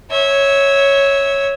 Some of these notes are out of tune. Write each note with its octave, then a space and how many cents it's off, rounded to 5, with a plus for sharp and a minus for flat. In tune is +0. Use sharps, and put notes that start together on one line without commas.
C#5 +0 E5 -20